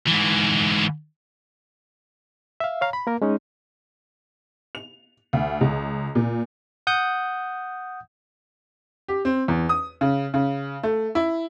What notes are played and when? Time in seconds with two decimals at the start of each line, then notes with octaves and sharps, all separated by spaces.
0.08 G#2 E3
2.60 E5 F5
2.81 C#5 F5 A#5
2.93 B5
3.07 A#3 A#4
3.22 G#3 C#4 D#4
4.75 F7
5.33 D2
5.61 C#2
6.15 A#2
6.87 F#5 D#6 G6
9.08 G4
9.25 C4
9.48 E2
9.69 D#6
10.01 C#3
10.34 C#3
10.83 A3
11.15 E4